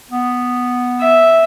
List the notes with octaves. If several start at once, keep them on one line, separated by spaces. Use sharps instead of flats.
B3
E5